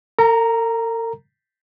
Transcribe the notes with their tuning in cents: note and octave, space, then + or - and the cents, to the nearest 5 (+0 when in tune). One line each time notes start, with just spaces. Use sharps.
A#4 -45 A#5 +0